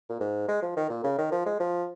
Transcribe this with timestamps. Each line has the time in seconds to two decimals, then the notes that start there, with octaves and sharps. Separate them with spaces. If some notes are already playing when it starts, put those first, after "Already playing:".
0.09 A#2
0.20 G#2
0.48 G#3
0.62 F3
0.76 D#3
0.90 A#2
1.04 C#3
1.18 D#3
1.32 F3
1.46 G#3
1.60 F3